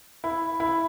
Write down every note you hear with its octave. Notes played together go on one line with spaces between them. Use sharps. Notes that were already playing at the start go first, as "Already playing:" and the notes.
E4
E4